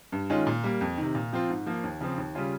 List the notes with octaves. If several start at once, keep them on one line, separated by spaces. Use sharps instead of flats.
G2
D#3 G#3 C#4 F4
A#2
G3 A#3
F2
D#3
C3
A#2
F3 C4 F4
G#2
F3 A#3
D#2
C#3 F3 C4
D#2
C#3 G3 C#4 F4